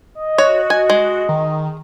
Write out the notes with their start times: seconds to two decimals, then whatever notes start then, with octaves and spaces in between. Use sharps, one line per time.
0.15 D#5
0.38 F#4 C#5
0.70 G#5
0.90 G#3
1.29 D#3